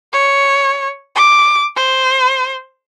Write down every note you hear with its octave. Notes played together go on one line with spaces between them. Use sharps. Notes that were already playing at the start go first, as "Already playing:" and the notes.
C#5
D6
C5